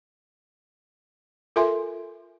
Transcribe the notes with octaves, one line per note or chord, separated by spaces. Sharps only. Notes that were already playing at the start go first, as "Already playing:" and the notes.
F4 A4 A#4 E5 G#5 C6